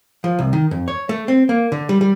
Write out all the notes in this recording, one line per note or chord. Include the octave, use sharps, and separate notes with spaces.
F3
C2
D#3
F2
C#5
A3
C4
A#3
D3
G3
G3